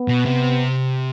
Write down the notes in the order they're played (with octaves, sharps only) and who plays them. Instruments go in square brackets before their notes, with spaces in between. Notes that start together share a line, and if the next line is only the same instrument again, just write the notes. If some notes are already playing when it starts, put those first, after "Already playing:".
Already playing: [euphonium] B3
[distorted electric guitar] B2
C3